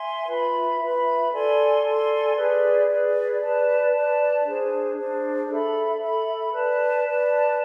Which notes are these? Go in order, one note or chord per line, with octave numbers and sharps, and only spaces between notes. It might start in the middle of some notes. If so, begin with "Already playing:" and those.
Already playing: E5 G#5 C6
F4 B4 E5 B5
F4 B4 E5 B5
A4 D5 G#5 C6
A4 D5 G#5 C6
G#4 B4 D5
G#4 B4 D5
B4 D5 A5
B4 D5 A5
D4 G#4 C5
D4 G#4 C5
A4 E5 B5
A4 E5 B5
B4 D5 A5
B4 D5 A5